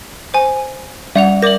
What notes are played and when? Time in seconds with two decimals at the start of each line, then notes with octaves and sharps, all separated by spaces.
0.34 C5 G#5
1.16 G3 D5 F#5 F7
1.42 A#4 D5 D6 A#6 F#7